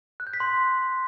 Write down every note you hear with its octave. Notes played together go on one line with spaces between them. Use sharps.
F#6
G6
B6
C6